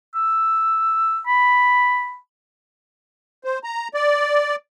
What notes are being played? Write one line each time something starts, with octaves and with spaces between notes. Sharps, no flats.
E6
B5
C5
A#5
D5